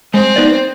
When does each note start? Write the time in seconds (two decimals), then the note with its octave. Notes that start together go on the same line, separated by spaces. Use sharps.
0.13 G#3 C4
0.36 B3 D#4 B4 D5